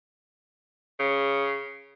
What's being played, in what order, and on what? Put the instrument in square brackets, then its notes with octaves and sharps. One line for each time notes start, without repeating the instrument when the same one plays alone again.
[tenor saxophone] C#3